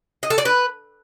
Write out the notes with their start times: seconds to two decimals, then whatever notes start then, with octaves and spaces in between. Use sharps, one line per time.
0.23 D#5
0.30 A4
0.38 D5
0.45 B4